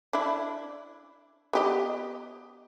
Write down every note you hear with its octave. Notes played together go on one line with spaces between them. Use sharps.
D4 E4
B3 G4 D#5